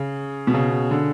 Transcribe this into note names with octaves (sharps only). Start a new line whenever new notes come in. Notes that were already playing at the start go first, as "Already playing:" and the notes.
Already playing: C#3
B2
C#3
D3